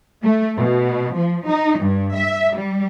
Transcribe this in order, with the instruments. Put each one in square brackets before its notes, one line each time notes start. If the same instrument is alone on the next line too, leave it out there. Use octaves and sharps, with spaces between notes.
[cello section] A3
B2
F3
D#4
G2
E5
G3